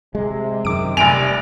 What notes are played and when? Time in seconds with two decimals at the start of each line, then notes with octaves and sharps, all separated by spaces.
0.15 C3 G#3
0.65 F#2 D#3 D6 D7
0.97 F1 G3 G#5 D7 F7